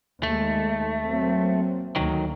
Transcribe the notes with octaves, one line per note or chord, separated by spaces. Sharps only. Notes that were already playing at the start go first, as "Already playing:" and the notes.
D#2 G#3 A3
F#3 A#3 C4
D2 D3 D#3 F#3 A#3